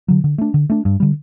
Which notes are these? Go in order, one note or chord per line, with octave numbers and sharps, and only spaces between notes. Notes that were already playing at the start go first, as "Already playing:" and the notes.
D3 F#3
D3
A3 D4
D3
A3 D4
G2
D3 G3